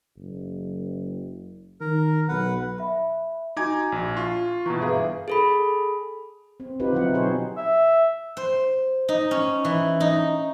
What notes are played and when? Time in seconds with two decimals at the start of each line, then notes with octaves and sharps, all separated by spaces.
0.17 F#1
1.81 D#3 A#4
2.29 B1 B4 F#5
2.79 E5 B5
3.57 D#4 F#4 G#5 A#5 D6 G#6
3.92 A#1
4.17 F4 C#6
4.66 B2 E3 A#5 C#6
4.80 G1 G#4 B4 E5 F5
5.28 G#4 A4 B5
6.60 C4
6.80 C4 D#4 F4 G4 B4
6.92 D3 F3 F#3 C4 E4 F#5
7.14 B2 F#3 D#4 G#4 C5 C#5
7.57 E5
8.37 C5
9.08 D#4
9.31 C#4
9.65 E3
10.00 D#4